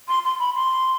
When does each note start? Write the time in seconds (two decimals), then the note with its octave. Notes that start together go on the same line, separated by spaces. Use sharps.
0.08 C6
0.24 C6
0.40 B5
0.55 C6